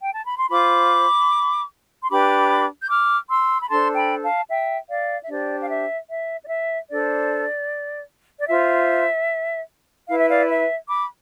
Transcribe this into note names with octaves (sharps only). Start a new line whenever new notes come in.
G5
A5
B5
C6
F4 C5 B5 D6
C6
D4 G4 B4 B5 D6
G6
D6 F6
C6 E6
B5
D4 A4 C5 A5 C6
G5 B5
F5 A5
E5 G5
D5 F5
E5
D4 G4 C5 D5
F5
E5
E5
D5
E5
D4 A4 C5 D5
D5
F4 C5 E5
E4 B4 F5
E5
D5 F5
E5
B5 D6